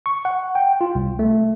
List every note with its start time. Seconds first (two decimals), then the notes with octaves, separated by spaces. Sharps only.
0.06 C#6
0.25 F#5
0.55 G5
0.81 F4
0.95 C2
1.19 A3